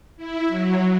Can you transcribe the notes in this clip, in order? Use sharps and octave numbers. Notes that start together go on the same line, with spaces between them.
E4
F#3